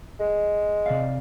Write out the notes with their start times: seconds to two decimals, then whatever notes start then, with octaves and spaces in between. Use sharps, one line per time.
0.20 G#3
0.86 C3 D5 F5